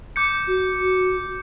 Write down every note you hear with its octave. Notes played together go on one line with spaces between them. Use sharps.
D6 G6 C#7
F#4